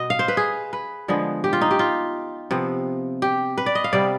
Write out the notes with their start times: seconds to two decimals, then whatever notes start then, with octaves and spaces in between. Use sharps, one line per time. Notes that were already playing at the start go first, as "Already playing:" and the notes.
Already playing: B2 B3 D#5
0.10 F5
0.19 C5
0.28 B4
0.37 G#4
0.73 B4
1.08 D3 F3 G#3 B3
1.44 G4
1.53 F4
1.61 D#4
1.71 G4
1.79 F4
2.51 C3 F3 B3
3.22 G4
3.58 B4
3.66 D5
3.75 D#5
3.84 F5
3.93 C3 G3 B3 D5